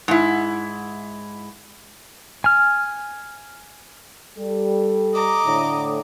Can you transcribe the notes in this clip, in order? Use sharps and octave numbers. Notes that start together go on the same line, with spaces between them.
G#2 E4
G#5 F6
G3 A4
D#5 A#5 D6
A2 D3 A3